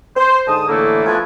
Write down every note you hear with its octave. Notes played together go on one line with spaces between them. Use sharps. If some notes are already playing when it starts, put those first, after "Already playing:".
C5
G#2 D3 A5 D#6
A2 D3 E3 A3 A#3 E4
F3 A3 B3 D4 G#5